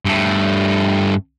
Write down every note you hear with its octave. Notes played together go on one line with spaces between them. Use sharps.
G2 A3